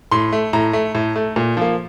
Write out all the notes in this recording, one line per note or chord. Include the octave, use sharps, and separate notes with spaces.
A2 C6
A3
A2 A#5
A3
A2
A3
A#2
F3 A#3